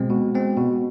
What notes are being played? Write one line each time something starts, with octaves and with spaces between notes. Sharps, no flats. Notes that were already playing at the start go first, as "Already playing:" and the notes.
Already playing: B2 G#3 C4
B2
G#3 C4
B2